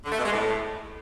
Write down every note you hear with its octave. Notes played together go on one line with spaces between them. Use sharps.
D3
A3
B2
G#3
A2